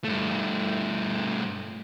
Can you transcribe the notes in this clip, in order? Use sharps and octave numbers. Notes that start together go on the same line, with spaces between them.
G2 A3